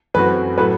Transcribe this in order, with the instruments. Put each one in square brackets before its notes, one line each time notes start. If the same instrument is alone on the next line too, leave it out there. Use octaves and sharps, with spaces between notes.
[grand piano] F#2 E3 A3 C4 F#4 [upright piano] B4
[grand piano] A2 F#3 A3 [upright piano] B4